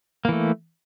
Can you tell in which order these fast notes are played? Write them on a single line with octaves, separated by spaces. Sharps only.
A#3 E3 A3